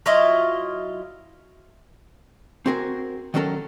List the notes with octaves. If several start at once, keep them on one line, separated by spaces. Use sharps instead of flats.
F#3 E4 F4 D#5
C4 F#4 G#4 A#4
D#3 F#3 C#4 A4 A#4